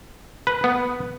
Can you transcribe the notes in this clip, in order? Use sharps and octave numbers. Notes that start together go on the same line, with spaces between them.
B4
B3